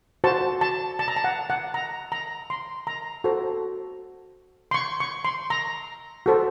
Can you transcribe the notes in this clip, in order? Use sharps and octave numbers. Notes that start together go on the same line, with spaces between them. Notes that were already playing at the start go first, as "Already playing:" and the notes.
F#4 C5 A5
A5
A5
A#5
A5
F#5
F#5
A#5
A#5
C6
A#5
F#4 A4 C5
C6
C#6
C#6
C6
A#5
F#4 A4 C5